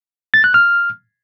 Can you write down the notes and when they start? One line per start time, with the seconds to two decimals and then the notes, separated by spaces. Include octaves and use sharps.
0.34 A6
0.44 F#6
0.54 F6